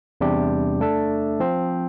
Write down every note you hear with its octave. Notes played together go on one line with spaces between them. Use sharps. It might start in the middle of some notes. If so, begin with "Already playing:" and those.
E2 C3 G3 D4 G4
A3 D4 A4 E5
F3 C4 F4